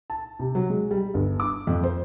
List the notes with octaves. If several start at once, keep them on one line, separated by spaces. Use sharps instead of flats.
A5
C3
F#3
G#3
G3
G1
D6
F2
C5